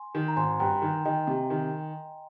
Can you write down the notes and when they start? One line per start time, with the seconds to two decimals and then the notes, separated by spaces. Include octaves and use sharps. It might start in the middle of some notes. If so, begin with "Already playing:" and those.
Already playing: G#5 C6
0.15 D#3
0.28 A#5
0.36 G#1 G#5 C6
0.60 G2 G5 A#5
0.82 D#3
1.05 D#3 D#5 G5
1.27 C3
1.50 D#3